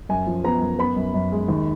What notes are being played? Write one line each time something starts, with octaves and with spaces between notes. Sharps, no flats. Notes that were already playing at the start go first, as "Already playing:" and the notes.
F#2 G#5
F3
B3 A#5
F#2
B3 B5
F#2
F#2
G#3
D#2